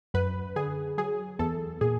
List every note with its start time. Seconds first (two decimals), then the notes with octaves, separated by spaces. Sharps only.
0.14 F#2 B4
0.56 D3 G#4
0.98 F#3 G#4
1.39 E2 A4
1.81 A#2 G#4